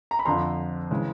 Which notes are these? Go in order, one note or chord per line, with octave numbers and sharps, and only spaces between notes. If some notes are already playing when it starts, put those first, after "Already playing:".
A#5
B5
F2 D3 F3 A#5 C6
C#3 E3 G#3